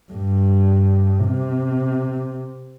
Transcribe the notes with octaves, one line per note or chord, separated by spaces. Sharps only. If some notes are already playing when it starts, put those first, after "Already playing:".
G2
C3